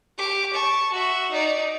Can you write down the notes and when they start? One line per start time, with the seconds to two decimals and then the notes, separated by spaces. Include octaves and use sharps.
0.18 G4 D6
0.53 A5 C#6
0.92 F#4 E5
1.31 D#4 D5